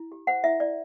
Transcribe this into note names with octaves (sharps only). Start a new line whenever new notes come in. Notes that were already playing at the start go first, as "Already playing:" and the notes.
Already playing: E4
G4
C5 F#5
E4 E5
E4 D5